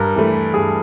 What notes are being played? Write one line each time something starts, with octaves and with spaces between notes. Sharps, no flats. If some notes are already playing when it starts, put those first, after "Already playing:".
Already playing: G2 A#4
E3 A3
G2 G#4